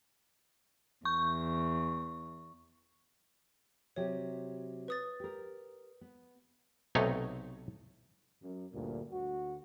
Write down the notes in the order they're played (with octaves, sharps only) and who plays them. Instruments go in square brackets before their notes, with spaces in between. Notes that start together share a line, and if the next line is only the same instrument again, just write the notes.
[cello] E2 [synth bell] C#6
[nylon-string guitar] C3 F#3 G4 [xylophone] C#5
[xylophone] B4 D#6 A6
[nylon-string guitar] G4 A#4
B3
[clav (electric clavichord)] B1 C3 A3 D#4 C#5 D#5
[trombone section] F#2
D2 G2 A#2
D2 F#4